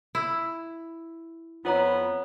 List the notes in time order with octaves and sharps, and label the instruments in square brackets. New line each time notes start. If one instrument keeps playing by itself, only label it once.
[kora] E4
[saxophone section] F2 B3 [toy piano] F4 C#5 A#5